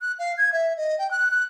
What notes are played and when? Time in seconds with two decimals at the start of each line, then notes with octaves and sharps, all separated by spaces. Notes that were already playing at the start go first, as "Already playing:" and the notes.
0.02 F#6
0.19 F5
0.38 G#6
0.53 E5
0.77 D#5
0.98 G5
1.11 F#6
1.31 F#6